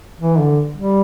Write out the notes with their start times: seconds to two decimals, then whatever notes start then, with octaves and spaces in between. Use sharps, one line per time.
0.20 E3
0.39 D3
0.77 G3